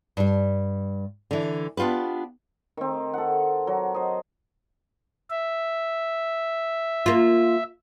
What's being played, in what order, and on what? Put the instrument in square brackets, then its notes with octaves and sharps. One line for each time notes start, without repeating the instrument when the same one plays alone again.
[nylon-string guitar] G2 G3
D3 E3
B3 D4 F4 G4 B4
[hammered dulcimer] D#3 C4
A4 F#5
F#3
C5 D#5
[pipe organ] E5
[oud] A#3 F4